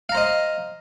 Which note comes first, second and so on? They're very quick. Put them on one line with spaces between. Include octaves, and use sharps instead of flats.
F5 A#5 C5 D#5